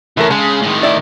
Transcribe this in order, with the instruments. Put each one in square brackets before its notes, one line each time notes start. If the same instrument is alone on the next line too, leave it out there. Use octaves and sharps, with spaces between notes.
[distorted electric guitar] F#2 [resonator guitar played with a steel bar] E3 A3 A#4
[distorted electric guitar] C#3 [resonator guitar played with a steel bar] G#3
[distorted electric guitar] A2 D#3
[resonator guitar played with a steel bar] E4 D5